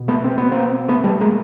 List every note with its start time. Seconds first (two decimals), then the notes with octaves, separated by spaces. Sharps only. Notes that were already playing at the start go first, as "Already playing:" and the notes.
Already playing: B2
0.08 A3 B3
0.24 C4
0.38 B3
0.51 A#3 C4
0.88 A3 B3
1.04 G3 A3
1.20 G#3 A#3